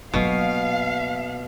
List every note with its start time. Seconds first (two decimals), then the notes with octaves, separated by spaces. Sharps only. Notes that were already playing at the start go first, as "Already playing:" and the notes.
0.14 B2 F#3 A#3 F5